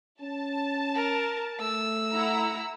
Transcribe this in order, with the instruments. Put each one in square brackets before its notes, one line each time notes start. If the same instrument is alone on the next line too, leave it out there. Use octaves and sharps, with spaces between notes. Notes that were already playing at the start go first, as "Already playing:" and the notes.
[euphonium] C#4 [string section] A5
[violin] A#4
[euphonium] A3 [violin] E6
[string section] E4 F#5 A#5